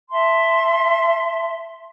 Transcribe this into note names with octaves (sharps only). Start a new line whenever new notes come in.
E5 A5 C6